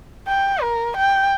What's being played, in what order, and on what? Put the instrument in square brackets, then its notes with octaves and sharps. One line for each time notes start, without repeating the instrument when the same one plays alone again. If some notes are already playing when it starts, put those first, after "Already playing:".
[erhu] G5
A#4
G5